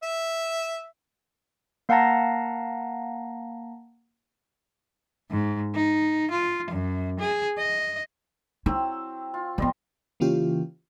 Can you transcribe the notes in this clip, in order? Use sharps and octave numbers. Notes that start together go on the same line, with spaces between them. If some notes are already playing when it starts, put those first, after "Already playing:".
E5
A#3 F5 F#5 A5 A#5 A#6
G#2
D#4
F4
F#2
G#4
D#5
F#3 C4 E4 E6
F4
F3 G3 B3 D#5 C6
C#3 E3 A#3 C#4 F4 G4